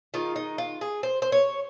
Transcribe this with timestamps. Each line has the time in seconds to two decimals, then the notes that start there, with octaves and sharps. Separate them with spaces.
0.14 D#3 G#3 D#4 F4
0.36 D#4
0.58 F4
0.81 G#4
1.03 C5
1.22 C5
1.32 C#5